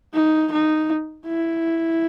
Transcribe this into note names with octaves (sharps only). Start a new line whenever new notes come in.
D#4
D#4
E4